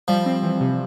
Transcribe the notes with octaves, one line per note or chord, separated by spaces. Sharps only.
F3 G3
C4
E3
C3